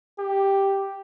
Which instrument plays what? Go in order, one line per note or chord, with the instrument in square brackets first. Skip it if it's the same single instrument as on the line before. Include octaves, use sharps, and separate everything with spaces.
[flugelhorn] G4